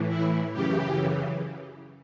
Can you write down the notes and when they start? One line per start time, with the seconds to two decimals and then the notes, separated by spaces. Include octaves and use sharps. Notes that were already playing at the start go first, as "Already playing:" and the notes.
Already playing: A2 E3
0.09 E4
0.53 F#2 C#3 E3 G4